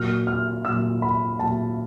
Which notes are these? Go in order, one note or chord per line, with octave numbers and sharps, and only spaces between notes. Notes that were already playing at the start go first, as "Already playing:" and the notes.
Already playing: A#2 F#3 F6
F6
A#2 F#3 E6
B5
A#2 F#3 A5